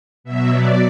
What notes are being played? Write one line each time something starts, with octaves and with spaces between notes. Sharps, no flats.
B2 F#3 E5
D5